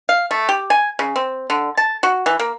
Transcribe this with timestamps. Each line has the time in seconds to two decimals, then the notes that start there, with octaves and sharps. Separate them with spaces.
0.09 F5
0.31 A3
0.49 G4
0.70 G#5
0.99 C#3
1.16 C4
1.50 D3
1.77 A5
2.03 F#4
2.26 E3
2.39 A#3